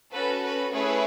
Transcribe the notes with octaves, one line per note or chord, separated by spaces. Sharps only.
C#4 F#4 A4 B4
B4
A3 C#4 E4 G#4 B4 C#5